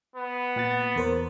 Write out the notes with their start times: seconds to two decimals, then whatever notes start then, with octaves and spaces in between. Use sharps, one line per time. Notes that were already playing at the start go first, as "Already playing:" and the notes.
0.16 B3
0.56 A#2 F#5 A6
0.96 E2 A#4 C5